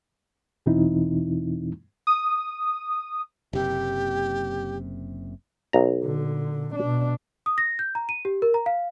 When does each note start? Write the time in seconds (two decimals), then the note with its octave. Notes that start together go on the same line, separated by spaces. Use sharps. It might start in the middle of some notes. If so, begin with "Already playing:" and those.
0.66 E2 B2 E3 C4 D#4 E4
2.07 D#6
3.53 F#1 C3 G4
5.73 B1 A#5
6.04 A#2 D3
6.76 B2 D4
7.46 D#6
7.58 A#6
7.79 G6
7.95 A#5
8.09 D#7
8.25 G4
8.42 A#4
8.54 A#5
8.66 F5